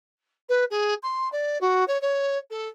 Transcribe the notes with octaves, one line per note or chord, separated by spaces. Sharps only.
B4
G#4
C6
D5
F#4
C#5
C#5
A4